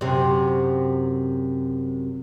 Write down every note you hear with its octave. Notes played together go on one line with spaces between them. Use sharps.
F#2 C3